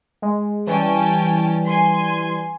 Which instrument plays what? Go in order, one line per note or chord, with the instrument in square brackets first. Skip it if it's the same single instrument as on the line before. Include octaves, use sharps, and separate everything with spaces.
[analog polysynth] G#3
[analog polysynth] E3 G3 [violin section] C#4 G5 A5
[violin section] G#5 C6